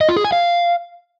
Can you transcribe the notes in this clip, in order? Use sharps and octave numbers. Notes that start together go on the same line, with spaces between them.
D#5
F4
G#4
G#5
F5